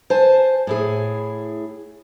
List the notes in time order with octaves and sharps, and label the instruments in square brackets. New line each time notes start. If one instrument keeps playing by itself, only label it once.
[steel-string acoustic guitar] C5 G#5 A5
A2 E4 G#4